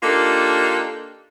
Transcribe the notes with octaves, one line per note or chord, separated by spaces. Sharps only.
A#3 D4 D#4 F4 G4 A4